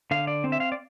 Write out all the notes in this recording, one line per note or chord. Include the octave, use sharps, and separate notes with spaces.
D3 F5
D5
C4
E5
F5
D5